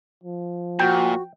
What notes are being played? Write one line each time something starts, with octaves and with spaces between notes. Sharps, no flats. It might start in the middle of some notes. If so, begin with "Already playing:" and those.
F3
A#2 F#4 G5